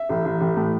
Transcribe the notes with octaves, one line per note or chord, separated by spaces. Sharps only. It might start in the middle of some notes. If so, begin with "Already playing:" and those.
Already playing: E5
A1
A1
A1
A2